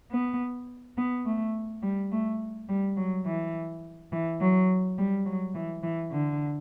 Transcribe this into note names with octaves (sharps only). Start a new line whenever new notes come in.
B3
B3
A3
G3
A3
G3
F#3
E3
E3
F#3
G3
F#3
E3
E3
D3